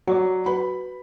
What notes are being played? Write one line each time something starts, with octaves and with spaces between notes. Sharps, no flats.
F#3 F#4 C#5 D5
F#4 B4 B5